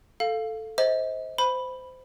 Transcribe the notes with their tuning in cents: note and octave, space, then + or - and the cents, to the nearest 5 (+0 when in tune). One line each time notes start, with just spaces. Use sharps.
A4 +0 F5 +0
C5 +0 D#5 +35
C5 -20 B5 +0